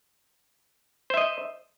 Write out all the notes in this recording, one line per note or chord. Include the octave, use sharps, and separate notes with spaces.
C5 D#5 E5